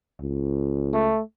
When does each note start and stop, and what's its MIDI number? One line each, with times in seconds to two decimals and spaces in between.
0.21 1.18 37
0.94 1.22 57